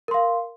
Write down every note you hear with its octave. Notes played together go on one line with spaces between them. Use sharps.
A#4 F5 C6